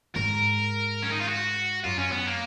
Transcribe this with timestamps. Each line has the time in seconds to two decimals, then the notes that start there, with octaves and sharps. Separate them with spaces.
0.15 G#2 A#4
1.02 C#4
1.12 D#4
1.20 F4
1.28 F#4
1.84 F#2 F4
1.98 C#4
2.12 B3
2.26 A#3